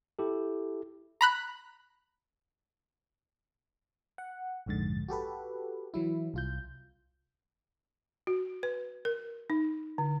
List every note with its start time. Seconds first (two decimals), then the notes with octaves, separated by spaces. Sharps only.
0.19 E4 G4 A4
1.21 A#5 B5 F#6
4.18 F#5
4.66 A#1 F2 G#2 D3 A6
5.08 F#4 G4 A4 B4
5.94 E3 F#3 E4
6.34 C2 F4 G6
8.27 F#4
8.63 B4
9.05 A#4
9.50 D#4
9.98 D3